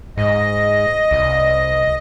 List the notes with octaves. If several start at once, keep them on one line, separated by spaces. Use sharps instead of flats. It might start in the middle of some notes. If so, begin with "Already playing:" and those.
G#2 D#5
C2